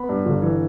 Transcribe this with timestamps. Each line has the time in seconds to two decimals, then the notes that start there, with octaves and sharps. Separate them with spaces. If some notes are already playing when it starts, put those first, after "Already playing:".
Already playing: B3 B5
0.09 G2
0.26 G1
0.42 E3